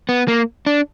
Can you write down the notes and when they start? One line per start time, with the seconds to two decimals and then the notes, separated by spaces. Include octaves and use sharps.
0.09 B3
0.28 A#3
0.66 D4